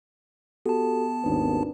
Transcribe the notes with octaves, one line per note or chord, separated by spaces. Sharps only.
B3 F#4 G4 A4 A5
G#1 D#2 C4 D4 B4